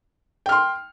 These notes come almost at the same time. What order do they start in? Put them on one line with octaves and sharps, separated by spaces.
G5 F6 C6